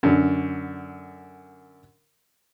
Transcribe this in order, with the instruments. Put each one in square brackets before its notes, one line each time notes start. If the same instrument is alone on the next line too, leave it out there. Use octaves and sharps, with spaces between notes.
[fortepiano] F#2 D3